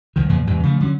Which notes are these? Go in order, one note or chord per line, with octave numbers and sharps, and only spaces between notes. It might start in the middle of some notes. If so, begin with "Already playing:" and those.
C2 D#3
E2 A#2 C#3 F3
E2 G#2 C3
C#3 F3 A3
D3 F#3 A3 C#4